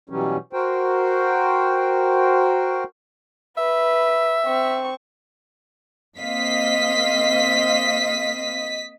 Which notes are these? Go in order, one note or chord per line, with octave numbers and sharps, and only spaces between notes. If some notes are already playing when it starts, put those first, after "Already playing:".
B2 E3 F#3 G3 C#4
F#4 A#4 C5 G5
B4 E5
C4 C#6
A#3 C4 D#5 F5 B6